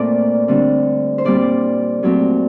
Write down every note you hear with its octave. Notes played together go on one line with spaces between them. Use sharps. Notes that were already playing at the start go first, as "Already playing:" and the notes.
Already playing: A#2 A3 C4 D5
D3 G3 C4
C5
A#2 G3 C4 D5
A#2 F#3 A3 C4